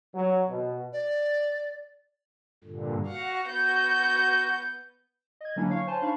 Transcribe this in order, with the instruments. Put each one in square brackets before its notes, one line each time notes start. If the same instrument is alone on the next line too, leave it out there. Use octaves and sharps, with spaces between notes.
[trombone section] F#3
B2
[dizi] D5
[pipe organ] G2 A#2 D3
[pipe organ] F#4 [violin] F5 F#5
[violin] B3 G6 [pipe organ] F#4
[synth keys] D#5 G#6
D3 F#3 A#3 C#4 D4 E4
C#5 F5 C#6
C5 C#5 G#5 A5 C6
D4 D#4 F5 A5 B5 C#6